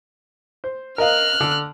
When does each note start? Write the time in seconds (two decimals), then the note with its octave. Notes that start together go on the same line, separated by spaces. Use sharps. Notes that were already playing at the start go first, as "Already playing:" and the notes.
0.64 C5
0.98 A#4 D#5 F5 F6 F#6
1.41 D3